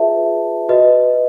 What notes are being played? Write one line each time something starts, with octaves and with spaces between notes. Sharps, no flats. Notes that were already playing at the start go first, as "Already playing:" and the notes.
Already playing: F4 G#4 B4 E5 A5
F#4 B4 D#5